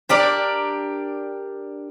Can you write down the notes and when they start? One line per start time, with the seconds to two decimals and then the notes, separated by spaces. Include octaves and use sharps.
0.09 D4 G4 A#4 D5